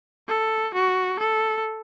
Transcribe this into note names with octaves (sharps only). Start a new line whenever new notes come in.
A4
F#4
A4